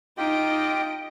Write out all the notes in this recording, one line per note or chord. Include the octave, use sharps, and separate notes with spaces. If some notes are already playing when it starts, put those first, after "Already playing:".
D#4 F4 G4 D#5 G5 D7